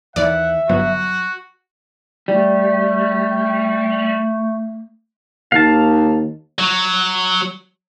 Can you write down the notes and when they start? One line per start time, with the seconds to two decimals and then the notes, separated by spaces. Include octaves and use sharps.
0.16 D#2 E3 D5 E5 F#5
0.69 G1 F#3 B3 F#4
2.28 G3 A3
5.52 D#2 F5 A5
6.59 F#3